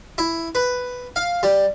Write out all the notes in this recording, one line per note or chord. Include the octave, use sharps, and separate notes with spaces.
E4
B4
F5
G3